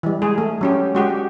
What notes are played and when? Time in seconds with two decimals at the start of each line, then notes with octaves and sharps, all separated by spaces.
0.03 E3 G3
0.22 G#3 G#4
0.38 A3
0.61 F#3 C#4 G4
0.95 G#3 F#4 G4